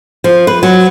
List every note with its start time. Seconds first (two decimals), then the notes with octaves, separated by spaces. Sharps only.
0.24 F3
0.47 B4
0.63 F#3